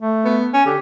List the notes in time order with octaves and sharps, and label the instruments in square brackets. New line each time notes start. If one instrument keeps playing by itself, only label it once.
[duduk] A3
[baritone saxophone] B3
C#4
[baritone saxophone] D3 [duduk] G4